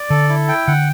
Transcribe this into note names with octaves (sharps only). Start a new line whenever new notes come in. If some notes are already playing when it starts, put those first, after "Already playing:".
Already playing: D5
D3 A4
E4
G5
D3 F#5